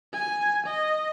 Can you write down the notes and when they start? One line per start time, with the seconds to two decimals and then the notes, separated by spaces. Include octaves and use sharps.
0.14 G#5
0.66 D#5